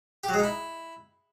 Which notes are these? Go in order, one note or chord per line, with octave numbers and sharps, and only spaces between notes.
G4
F#3
G#3
D#4
E4